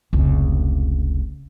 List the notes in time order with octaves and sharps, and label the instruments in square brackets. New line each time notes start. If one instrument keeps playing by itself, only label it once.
[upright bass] F1 C#2